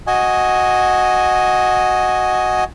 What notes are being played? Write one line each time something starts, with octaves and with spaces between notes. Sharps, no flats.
F#4 D#5 G#5